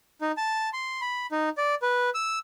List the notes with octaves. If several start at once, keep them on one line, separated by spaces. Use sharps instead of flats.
D#4
A5
C6
B5
D#4
D5
B4
E6